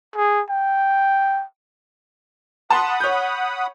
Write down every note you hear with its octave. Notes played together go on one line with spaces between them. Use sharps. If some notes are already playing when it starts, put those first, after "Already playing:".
G#4
G5
F#5 A5 B5 C6 D#6
C#5 G6